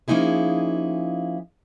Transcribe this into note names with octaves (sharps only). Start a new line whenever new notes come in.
F3 A#3 C#4 D#4 E4 G#4